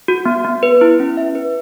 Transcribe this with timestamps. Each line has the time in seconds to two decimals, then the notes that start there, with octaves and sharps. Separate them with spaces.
0.08 F#4
0.25 B3
0.44 B3
0.63 B4
0.81 E4
1.00 C#4
1.17 E5
1.35 B4